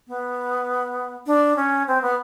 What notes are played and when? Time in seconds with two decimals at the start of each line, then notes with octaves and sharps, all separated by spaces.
0.08 B3
1.27 D4
1.56 C#4
1.87 C4
2.02 B3